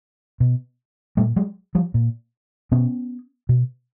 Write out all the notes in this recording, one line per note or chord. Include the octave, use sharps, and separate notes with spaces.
B2
A#2 G3 A3
F#3 G#3
F3 G3
A#2
B2 B3 C#4
B2